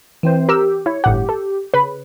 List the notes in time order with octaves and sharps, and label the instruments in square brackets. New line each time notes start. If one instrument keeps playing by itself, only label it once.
[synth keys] E3 C4 C5
[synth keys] G4 [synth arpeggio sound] A#4 E6
[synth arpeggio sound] E4 [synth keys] C#5
[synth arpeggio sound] G1 A2 F#5 [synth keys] G4
[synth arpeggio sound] A4
[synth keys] C#3 [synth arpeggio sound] B4 B5